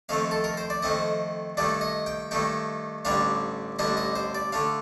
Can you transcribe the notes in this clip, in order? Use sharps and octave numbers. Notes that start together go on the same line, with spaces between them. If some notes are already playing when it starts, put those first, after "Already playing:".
F2 D#3 A3 C4 F5
A4
A#4
C5
D5
F2 D#3 A3 C4 D#5
G2 D#3 A3 D#4 D5
D#5
G5
G2 D#3 A3 D#4 G5
A1 G2 D3 G3 D4 F5
A1 G2 D3 G3 D4 D#5
D#5
C5
D5
D3 A3 D4 F5